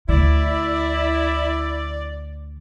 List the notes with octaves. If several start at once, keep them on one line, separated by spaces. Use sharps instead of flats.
D2 D3 E4 D5